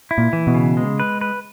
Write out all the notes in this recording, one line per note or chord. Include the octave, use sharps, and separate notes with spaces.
E4
A#2
E3
B2
C#3
G#3
B4
B4